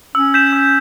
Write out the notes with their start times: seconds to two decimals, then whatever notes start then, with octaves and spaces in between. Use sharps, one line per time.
0.15 C#4 E6
0.34 G6 B6 E7
0.53 E6